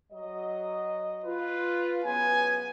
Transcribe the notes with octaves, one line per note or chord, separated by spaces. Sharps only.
F#3 D#5
F4 B4
C#3 F#3 B3 G#5